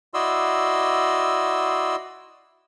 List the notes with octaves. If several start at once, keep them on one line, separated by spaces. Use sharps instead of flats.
E4 F#4 D5 D#5 C6 E6